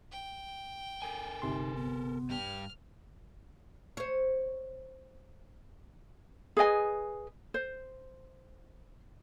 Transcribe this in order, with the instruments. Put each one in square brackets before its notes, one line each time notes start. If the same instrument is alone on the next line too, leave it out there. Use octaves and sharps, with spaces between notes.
[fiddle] G5
[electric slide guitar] A4 A#4 G#5
[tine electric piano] G1 C3 C6 [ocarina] D#4
[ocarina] B3
[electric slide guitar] G2 G3 G4 [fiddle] F6
[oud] C5 C#5
[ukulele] G#4 B4 D#5 G#5
C5